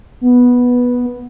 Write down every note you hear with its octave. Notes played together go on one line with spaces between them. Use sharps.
B3